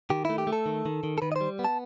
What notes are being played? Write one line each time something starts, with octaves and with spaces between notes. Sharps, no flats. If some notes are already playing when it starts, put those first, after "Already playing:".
D#3 G4
A3 E4
G4
A3
A4
D#3
D#3
D#3
A4
D#3 B4
D#5
C5
G3
B3
A5